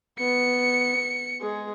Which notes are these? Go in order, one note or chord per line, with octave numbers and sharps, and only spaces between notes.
B3 C#7
G#3 G#4